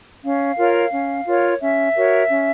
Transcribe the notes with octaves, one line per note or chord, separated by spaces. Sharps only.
C#4 F5
F4 A#4 C#5
C#4
F4 A#4 C#5
C#4 E5
F#4 A#4 C#5
C#4